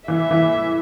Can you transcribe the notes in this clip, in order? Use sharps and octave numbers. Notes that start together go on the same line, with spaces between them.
E3 E5
E3